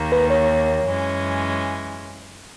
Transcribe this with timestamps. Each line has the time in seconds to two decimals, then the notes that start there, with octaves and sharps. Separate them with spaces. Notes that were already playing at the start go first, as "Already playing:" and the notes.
Already playing: D#2 D#3 A#3
0.12 B4
0.30 C#5
0.86 F#2 E3 G#3 C#4